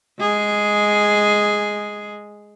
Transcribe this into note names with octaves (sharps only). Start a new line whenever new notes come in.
G#3 G#4